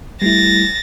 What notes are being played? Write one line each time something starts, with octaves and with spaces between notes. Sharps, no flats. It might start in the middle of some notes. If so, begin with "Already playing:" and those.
G3 A3 E4 A6 A#6